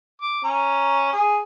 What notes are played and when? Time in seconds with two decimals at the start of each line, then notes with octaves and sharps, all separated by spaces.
0.21 D6
0.44 C#4 A#5
1.13 G#4